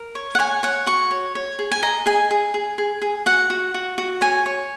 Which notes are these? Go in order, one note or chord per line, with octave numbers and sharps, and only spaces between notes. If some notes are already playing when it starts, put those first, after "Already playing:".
Already playing: A#4
C#5
F#5
C#5 G#5
C#5 F#5
F#4 C#6
C#5
C#5
G#4
G#5
D#5 A#5
G#4 G#5
G#4
G#4
G#4
G#4
F#4 F#5
F#4
F#4
F#4
C#5 G#5
C#5